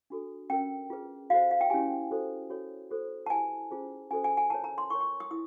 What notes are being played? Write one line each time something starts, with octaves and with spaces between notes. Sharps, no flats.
D4 F#4 A4
C#4 F4 A#4 G5
F4 G#4 B4
F#4 A4 C5 F5
F5
G5
C#4 E4 G4 G#5
F#4 A4 C5
F#4 A4 C#5
F#4 A4 C5
A5
E4 G4 B4 G#5
C#4 F4 G#4 C5
C#4 F#4 A4 C5 G#5
G#5
G#5
F4 A#4 C#5 A5
A#5
C6
F4 A#4 C#5 C#6
C#6
D#6
E4 D#6